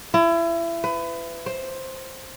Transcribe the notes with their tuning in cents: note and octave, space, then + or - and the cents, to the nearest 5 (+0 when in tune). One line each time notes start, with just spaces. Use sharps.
E4 +30
B4 +30
C5 +10